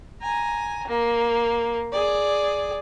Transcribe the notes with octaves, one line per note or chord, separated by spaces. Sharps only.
G#5 A#5
A#3
G#4 D5